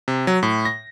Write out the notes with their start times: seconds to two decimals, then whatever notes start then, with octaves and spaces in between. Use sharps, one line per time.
0.08 C3
0.27 F#3
0.43 A2
0.65 A#6